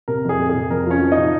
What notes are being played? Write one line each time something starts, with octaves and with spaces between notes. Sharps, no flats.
C3 A#4
F2
G#4
C3
G#4
C3
F2 A#4
F3 C#4 C#5
F3
D#4 D#5
C3